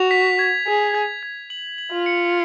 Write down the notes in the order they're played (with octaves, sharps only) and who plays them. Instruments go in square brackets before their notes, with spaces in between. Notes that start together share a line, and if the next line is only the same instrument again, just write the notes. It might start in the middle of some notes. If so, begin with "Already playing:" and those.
Already playing: [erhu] F#4 [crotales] F7
[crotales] B6
G#6
[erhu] G#4 [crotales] B6
[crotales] G#6
G#6
F#7
F#7
[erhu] F4
[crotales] C#7